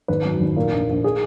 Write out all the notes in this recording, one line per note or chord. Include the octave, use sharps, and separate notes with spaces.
G#1 B4
F#2
G#1
A#2 A#4
A#1
A#1
G#4